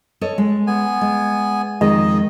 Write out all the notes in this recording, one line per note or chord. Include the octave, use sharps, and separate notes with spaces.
A4 C#5 D#5
G#3
B3 G#5
G#3
F2 D#3 G#3 D#5